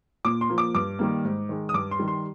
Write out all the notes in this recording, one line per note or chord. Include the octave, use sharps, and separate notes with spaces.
A#2 D6
C6
F3 A#3
D6
G2 D6
D#3 G3 A#3
G#2
D#3 G#3
D#6
G2 D6
C6
D#3 G3
C6